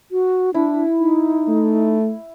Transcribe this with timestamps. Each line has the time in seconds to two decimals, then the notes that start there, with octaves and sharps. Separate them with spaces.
0.11 F#4
0.54 D4 E4
0.99 D#4
1.48 A3